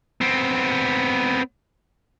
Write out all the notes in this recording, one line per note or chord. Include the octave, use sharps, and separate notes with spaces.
B3 C4